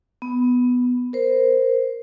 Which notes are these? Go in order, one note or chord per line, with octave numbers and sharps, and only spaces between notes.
B3
A#4 C5